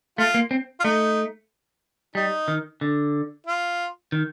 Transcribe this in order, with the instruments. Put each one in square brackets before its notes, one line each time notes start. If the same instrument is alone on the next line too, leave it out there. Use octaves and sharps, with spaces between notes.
[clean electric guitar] A3 [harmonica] F4
[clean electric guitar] A#3
C4
[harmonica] F4
[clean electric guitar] A3 [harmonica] D#4
[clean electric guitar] G3 [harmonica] D#4
[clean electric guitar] D#3
D3
[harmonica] F4
[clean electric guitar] D#3